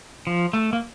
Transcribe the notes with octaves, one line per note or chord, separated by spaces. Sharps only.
F3
A3
A#3